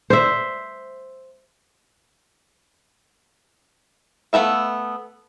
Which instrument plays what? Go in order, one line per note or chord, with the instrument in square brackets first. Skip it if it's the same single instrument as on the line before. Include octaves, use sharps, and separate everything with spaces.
[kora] C5 E5
[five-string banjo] A3 B3 E5 F5